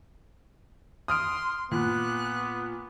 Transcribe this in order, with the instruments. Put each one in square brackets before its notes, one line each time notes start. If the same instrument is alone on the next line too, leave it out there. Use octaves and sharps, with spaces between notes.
[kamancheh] C6 [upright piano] D#6 F6 D7
[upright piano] A#2 [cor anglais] B3 [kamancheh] F#6